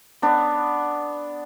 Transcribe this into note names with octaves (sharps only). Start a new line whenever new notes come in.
B3 D4